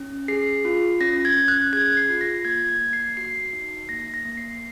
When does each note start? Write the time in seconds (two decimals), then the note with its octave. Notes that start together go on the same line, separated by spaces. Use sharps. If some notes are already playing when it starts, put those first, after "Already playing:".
Already playing: C#4
0.28 G#4 C7
0.65 F4
1.01 C#4 A#6
1.25 G#6
1.36 C#4
1.48 F#6
1.73 G#4 G#6
1.97 C7
2.09 F4
2.21 A#6
2.45 A#3 G#6
2.69 G#6
2.80 A#3
2.93 C7
3.17 F#4 C7
3.53 D#4
3.89 A#3 A#6
4.14 A#6
4.25 A#3
4.37 C7